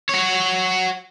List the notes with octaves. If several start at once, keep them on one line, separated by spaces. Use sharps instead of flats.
F#4 C#5